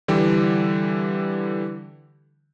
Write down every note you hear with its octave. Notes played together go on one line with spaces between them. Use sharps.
D3 E3 G3 G4